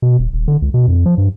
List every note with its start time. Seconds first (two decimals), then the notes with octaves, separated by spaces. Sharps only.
0.02 B2
0.19 D#1
0.33 D#1
0.48 D3
0.62 C#2
0.74 B2
0.88 F2
1.06 F3
1.18 G2